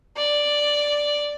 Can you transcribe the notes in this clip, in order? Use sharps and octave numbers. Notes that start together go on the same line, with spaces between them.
D5